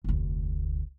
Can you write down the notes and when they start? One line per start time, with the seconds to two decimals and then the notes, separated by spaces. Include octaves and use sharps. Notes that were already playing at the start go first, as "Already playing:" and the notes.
0.04 F1 D2